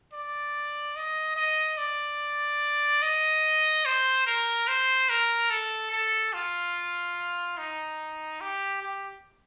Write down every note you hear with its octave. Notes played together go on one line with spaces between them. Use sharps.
D5
D#5
D#5
D5
D#5
C5
A#4
C5
A#4
A4
A4
F4
D#4
G4
G4